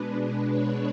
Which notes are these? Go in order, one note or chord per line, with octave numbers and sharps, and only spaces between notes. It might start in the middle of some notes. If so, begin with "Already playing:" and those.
Already playing: B2 G#3 D4 B4
B4
C#5